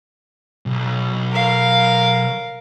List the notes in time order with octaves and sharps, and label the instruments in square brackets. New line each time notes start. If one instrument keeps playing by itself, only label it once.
[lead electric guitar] B1
[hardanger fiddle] A#4 F5